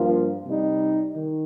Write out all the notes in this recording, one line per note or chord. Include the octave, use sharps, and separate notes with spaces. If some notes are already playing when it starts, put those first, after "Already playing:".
Already playing: G2 F3 A#3 F4
C3 G3 D#4
D#3